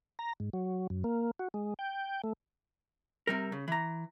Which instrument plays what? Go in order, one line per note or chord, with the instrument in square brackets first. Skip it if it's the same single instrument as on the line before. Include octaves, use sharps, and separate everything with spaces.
[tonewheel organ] A#5
G#2
F#3
F#2
A#3
F#4
G#3
G5
A3
[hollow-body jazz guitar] C3 G3 A#4
C#3
E3 A#5